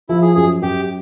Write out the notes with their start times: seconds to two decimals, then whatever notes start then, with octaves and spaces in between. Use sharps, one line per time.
0.09 F3 E4
0.22 G#4
0.35 F#2 G#4
0.62 F#2 G4